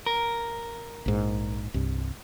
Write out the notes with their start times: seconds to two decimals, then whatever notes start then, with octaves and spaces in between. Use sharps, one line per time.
0.06 A#4
1.06 A#1 G#2
1.74 C2 G2